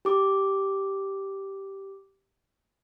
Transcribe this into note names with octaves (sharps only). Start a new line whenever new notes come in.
G4 D6